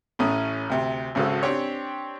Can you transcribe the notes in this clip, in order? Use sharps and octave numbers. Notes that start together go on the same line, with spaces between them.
A1 A2 A3 C#4 D#6
D2 C3
G#1 G#2 C#3 C#4 F#4 A4
C4 D4 G4 C#5